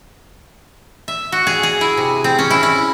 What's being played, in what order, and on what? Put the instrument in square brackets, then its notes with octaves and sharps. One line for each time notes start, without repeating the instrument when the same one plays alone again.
[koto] E5
F#4
G#4
G#4
E4
C3
C4
C#4
E4
E4